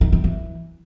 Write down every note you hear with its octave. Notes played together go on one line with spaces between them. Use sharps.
D#3
D#3
E3